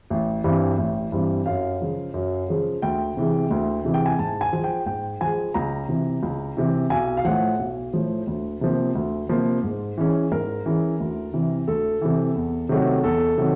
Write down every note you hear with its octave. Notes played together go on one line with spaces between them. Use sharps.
A1
G2 E3 G3 C4
A1
G2 E3 G3 C4
F#2 F5
C#3 F3 G#3
F#2
C#3 F3 G#3
D2 G5
C3 E3 G#3
D2
C3 E3 G#3
G5
G#5
G#2 A5
G#5
F3 G#3
G5
G#2 G5
F3 G#3 G#5
C#2 A#5
C3 E3
C#2
C3 E3
B1 G#5
F5
A2 F3 F#5
B1
A2 F3
D2
C3 F3 A#3
D2
C3 F3 A#3
G#2
E3 G#3 C#4
G#2 A#4
E3 G#3 C#4
D2
C3 E3
D2 A4
C3 E3
E2
C3 D#3 F#3 A3
E2 A4
C3 D#3 F#3